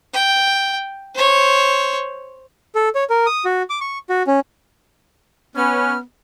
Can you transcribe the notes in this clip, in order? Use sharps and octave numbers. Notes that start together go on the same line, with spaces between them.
G5
C5 C#5
A4
C#5
A#4
D#6
F#4
D6
C#6
F#4
C#4
B3 C#4 B4 F6